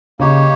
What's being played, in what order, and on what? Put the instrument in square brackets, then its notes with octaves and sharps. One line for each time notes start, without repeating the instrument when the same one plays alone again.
[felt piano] C#3 [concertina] A#3 D#4 G4 C#5